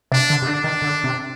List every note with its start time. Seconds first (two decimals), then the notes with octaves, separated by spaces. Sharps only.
0.12 C3 D4
0.30 D3
0.42 C3
0.46 D3 D4
0.64 D#3
0.82 D3
1.04 C3